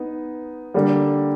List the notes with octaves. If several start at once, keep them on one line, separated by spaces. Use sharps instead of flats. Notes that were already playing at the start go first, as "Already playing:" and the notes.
Already playing: B3 D#4
D3 G3 A#3